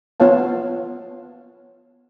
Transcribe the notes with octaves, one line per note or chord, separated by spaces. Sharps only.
B3 F4 C#5 F5 A5